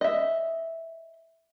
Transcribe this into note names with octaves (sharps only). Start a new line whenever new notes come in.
D#5 E5